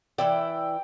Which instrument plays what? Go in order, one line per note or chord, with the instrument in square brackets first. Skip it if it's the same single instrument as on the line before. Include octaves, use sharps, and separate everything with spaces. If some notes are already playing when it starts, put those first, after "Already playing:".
[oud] E3 E4 D5 [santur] G5